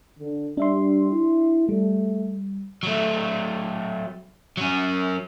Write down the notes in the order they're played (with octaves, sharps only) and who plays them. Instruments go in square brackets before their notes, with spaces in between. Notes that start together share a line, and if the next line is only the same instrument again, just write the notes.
[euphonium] D3
[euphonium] G3 [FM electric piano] D4 E5 C6
[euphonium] E4
[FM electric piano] G3 [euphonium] A3
[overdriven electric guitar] F#3 A3
F#3 C#4